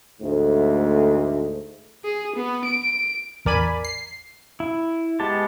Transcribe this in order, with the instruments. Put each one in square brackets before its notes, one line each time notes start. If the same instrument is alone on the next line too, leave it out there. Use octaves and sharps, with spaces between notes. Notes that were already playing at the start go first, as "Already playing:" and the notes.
[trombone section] D2 G#2 A3
[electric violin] G#4
B3
D7
[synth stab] A1 E2 A#4 D5 G#5 B5
C7
[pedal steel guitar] E4
G#3 B3 G4 A5